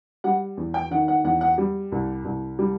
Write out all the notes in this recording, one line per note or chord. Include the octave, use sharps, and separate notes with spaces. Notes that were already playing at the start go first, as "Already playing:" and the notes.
G3 F#5
E2
G5
D#3 F#5
F#5
E2 F#5
F#5
G3
C2
C2
G3